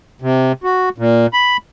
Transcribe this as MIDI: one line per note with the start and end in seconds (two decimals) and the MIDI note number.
0.22 0.52 48
0.64 0.89 66
0.98 1.27 46
1.34 1.57 83